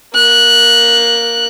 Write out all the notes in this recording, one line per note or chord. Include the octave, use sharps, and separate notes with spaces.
A#3 F#6